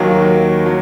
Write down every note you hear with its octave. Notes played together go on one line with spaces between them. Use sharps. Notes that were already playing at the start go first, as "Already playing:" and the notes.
Already playing: D#2 D#3 F#3 A#3
F#3